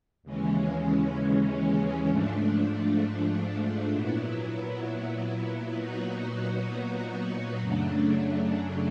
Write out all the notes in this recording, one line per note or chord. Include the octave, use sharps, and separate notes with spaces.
D#2 C#3 E3 G#3 C#4
G#2 F3 A3 D4
A#2 F#3 B3 E4
A#2 F#3 B3 D#4 F#4
F#2 C#3 F#3 A3 D4